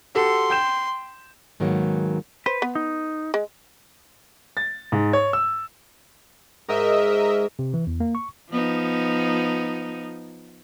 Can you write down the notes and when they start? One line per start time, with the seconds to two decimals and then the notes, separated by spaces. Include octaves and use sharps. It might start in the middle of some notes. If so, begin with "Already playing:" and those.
0.15 F#4 G4 A4 C6
0.50 G5 G6 E7
1.60 G#2 D#3 F#3 G#3 A#3 B3
2.46 B4 C5
2.62 B3
2.75 D#4
3.34 G#3
4.57 A6
4.92 G#2
5.13 C#5
5.33 E6
6.68 G#2 A#4 D#5 E5
7.59 C3
7.74 E3
7.87 E2
8.00 A#3
8.15 C#6
8.51 F3 B3 D#4